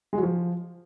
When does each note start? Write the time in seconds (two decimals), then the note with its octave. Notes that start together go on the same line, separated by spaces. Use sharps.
0.13 G#3
0.18 F#3
0.23 F3